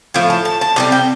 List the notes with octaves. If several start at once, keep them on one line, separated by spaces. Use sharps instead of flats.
A2 F3
A5
A5
A5
C3 D#3 G3 C4
G5